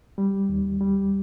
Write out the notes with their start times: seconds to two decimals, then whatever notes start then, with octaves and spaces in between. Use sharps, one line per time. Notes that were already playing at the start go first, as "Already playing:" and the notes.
0.18 G3
0.49 D#2
0.81 G3